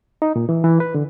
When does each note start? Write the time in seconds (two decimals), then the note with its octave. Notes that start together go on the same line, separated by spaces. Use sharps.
0.22 D#4
0.36 A#2
0.49 E3
0.64 E3
0.80 B4
0.95 D3